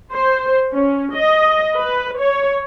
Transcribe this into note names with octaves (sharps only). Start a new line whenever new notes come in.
C5
C#4
D#5
B4
C#5